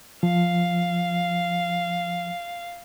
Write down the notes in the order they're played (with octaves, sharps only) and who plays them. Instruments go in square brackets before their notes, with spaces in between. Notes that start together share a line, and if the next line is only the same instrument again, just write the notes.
[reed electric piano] F3 [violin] F5